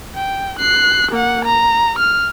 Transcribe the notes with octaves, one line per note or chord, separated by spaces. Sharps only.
G5
F#6 C7
A#3 F#5
A#5
F6